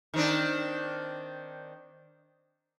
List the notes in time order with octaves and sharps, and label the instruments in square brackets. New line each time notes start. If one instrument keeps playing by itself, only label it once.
[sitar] D#3 C4 D4